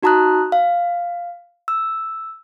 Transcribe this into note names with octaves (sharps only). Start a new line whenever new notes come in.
D#4 F#4 A5 A#5 D#6 F#6
F5
E6